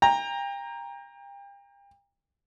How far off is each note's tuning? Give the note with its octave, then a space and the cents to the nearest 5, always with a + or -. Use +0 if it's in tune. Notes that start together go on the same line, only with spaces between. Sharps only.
G5 +35 A#5 +0